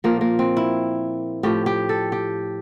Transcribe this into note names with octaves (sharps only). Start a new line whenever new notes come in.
A#2 F3 A#3
A#3
C4
E4
A2 F3 G4
G4
A4
G4